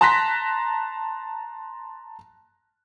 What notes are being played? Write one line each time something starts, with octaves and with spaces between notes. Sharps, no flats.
A5 A#5 C6 F#6 A#6 B6